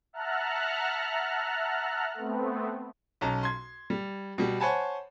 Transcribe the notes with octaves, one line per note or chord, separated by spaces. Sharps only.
E5 F#5 A5 A#5 F6 F#6
A3 B3 C4
B1 C#4 A5 A#5
C6 G#6
G3
B2 G3
C5 C#5 F#5 G#5 A5 B5